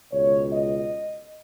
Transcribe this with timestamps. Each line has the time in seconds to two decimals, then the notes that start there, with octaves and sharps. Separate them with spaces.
0.12 C#2 B2 C#5
0.52 D#5